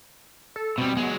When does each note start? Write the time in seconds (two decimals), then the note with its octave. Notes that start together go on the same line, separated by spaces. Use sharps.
0.56 A4
0.78 B2 G3 C4
0.97 F#3 G#3 B3